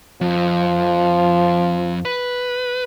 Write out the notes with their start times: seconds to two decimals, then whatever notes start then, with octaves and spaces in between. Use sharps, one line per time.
0.21 F2 F3
2.05 B4